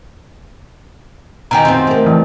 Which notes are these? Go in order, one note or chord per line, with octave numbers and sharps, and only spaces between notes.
B2 D#3 G4 G#5 A#5
F#2 C4 F4 C5
A3 A#4
E3